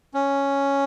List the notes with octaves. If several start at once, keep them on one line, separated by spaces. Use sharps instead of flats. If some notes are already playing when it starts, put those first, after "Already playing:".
C#4